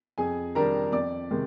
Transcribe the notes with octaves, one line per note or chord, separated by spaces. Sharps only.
F2 G#4 G#5
D#3 G3 D4 A#4 A#5
F2 D5 D6
C3 D#3 G#3